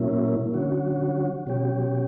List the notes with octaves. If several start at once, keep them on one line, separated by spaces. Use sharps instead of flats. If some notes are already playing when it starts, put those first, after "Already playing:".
Already playing: A#2 F#3 A#3 C#4 E4
D3 F#3 C#4 F#4
B2 F#3 C#4 G4